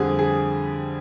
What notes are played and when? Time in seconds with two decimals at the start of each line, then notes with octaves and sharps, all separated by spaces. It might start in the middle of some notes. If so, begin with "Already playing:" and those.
Already playing: F2 D3 G3 G#4
0.19 G#4